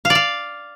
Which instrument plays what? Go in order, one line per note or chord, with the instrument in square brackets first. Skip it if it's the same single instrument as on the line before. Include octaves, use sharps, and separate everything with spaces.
[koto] F5
D5
F5